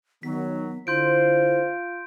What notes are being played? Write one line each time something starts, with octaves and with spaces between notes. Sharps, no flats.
D#3 F#3 B3 B6
D3 E4 F4 C5 C6 G6 D7